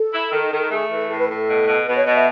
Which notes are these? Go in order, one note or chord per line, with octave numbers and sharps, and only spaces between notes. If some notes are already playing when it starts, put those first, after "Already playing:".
Already playing: A4
E4
D#3
D#3
A3 G#4
E3
A4
A2 A4
B4
A2 A4
B2
B2
B2 B4
C#5
B2 D#5
E5